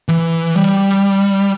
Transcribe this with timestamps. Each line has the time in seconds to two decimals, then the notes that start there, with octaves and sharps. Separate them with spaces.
0.08 E3
0.55 G3